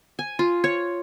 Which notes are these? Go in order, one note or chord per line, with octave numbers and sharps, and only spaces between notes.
G#5
F4
C#5